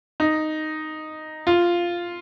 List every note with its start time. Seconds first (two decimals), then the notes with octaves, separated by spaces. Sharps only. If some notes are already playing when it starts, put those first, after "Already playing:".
0.20 D#4
1.47 F4